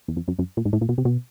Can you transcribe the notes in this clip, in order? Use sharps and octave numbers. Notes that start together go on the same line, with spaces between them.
E2
F2
F#2
F#2
A#2
G#2
A2
A#2
B2
C3
B2